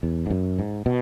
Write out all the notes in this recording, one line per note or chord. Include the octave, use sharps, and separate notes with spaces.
E2
G#2
F#2
G#2
B2